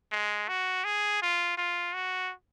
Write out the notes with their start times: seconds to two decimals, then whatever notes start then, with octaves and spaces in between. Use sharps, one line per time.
0.12 G#3
0.48 F#4
0.84 G#4
1.22 F4
1.58 F4
1.94 F#4